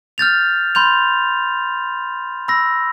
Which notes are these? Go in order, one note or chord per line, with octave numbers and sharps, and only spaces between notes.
F6 G6 A6 F7
B5 C6 G6 F7
B5 E6 A#6